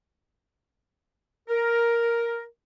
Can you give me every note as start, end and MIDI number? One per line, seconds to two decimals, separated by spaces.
1.48 2.42 70